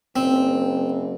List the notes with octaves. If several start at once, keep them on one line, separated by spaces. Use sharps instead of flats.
F#1 C4